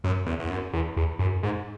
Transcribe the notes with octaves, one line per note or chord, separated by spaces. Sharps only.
F#2
E2
E2
F#2
E2
E2
F#2
G#2